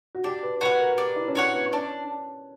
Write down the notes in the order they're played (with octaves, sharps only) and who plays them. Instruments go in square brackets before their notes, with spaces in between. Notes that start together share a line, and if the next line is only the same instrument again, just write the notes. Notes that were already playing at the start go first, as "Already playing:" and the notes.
[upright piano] F#4
[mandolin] D4 [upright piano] G4
[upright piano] B4
[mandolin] F#4 C#5 F#5 [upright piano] B4
[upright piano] A#4
[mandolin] D4 [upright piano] G4
[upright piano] E4
C#4
[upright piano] D4 [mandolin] F#4 C#5 F#5
[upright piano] B3
[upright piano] C#4 [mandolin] D4